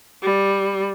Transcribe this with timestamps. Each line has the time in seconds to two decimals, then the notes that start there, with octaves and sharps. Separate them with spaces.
0.22 G3